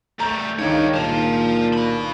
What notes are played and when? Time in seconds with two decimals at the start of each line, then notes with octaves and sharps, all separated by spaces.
0.20 G3 A3 A#5 G6
0.59 C#2 G2 D#3 D#4 C#5 G5
0.94 A#2 F5 A5
1.73 F#4 B5